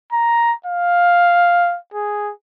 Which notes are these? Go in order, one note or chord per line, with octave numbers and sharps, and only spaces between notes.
A#5
F5
G#4